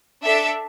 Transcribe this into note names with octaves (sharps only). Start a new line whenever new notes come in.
D4 A4 E5